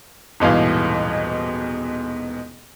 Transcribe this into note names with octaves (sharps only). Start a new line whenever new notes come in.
D#1 G#2 B2 E3 F5